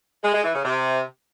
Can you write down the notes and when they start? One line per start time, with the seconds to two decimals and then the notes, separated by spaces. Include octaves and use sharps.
0.23 G#3
0.33 G#3
0.44 E3
0.54 C#3
0.65 C3